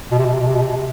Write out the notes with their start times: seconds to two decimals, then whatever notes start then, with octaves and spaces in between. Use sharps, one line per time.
0.12 B2
0.19 C3
0.25 B2
0.34 C3
0.40 B2
0.47 C3
0.55 B2
0.62 C3
0.69 B2
0.76 C3